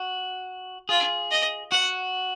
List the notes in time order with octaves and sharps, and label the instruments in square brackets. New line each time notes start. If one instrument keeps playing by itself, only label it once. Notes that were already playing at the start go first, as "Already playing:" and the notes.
Already playing: [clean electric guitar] F#4
[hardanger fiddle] F4 [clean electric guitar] G#4
[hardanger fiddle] D#5
[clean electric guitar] F#4 [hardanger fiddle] F#5